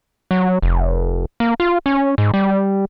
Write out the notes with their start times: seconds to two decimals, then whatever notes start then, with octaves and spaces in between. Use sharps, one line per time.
0.31 F#3
0.62 F1
1.40 A#3
1.60 F4
1.86 C#4
2.18 G#2
2.34 G3